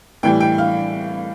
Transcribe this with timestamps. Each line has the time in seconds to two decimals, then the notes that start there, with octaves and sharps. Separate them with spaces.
0.23 A2 E3 G3 G5
0.40 G5
0.58 F5